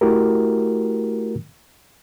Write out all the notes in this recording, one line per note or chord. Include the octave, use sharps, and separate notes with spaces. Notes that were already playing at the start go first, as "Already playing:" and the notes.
A3 E4 F#4 G4 A#4